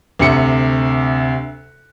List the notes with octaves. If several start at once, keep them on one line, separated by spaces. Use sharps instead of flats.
D2 C3 C#7